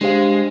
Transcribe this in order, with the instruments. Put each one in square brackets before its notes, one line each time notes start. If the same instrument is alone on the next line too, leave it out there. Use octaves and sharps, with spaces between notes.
[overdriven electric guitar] G#3 [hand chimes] D4 G4 C5 F5